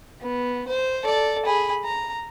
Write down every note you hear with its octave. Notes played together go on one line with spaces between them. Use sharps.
B3
C5
A4 D5
G#4 B5
A#5